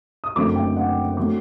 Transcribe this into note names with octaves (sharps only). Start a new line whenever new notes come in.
D#6
F#1 F#2 D3 A3 C4 D6
G5
F#5
D3 F#3 A3 C4 D6